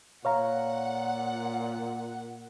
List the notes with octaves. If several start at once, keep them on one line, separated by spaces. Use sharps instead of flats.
A#2 C#5 F5 F#5 A#5